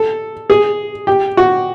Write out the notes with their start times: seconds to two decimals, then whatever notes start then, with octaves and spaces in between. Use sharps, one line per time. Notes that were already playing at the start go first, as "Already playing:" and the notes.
Already playing: A4
0.50 G#4
1.07 G4
1.37 F#4